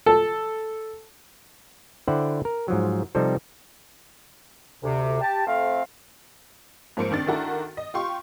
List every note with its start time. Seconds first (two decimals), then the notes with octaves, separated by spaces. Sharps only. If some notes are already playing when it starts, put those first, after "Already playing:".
0.06 A4
2.08 D3 E4 C5 D5 F#5 G5
2.45 A#4
2.68 G#2 F3 F#3
3.15 C3 F3 G3 C4 D#4 A4
4.83 D2 C3
5.21 G4 A5
5.47 F2 A3 C4 F5
6.97 G#2 F3 A#3 C5 C#7 D7
7.11 C2 D#3 D4 A6
7.27 D#3 D4 E4 F#4 A4 A#4
7.77 D#5
7.94 F4 G4 C6 C#6